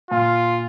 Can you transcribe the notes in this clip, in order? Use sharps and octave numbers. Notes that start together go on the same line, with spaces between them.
A#2 F4